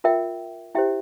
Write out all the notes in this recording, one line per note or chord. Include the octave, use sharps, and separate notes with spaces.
F4 A#4 E5 G5
E4 G4 C5 E5 G5